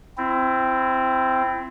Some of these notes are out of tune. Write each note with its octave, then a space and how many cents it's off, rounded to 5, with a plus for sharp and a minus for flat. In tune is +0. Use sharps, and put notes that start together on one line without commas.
C4 -5 E4 +25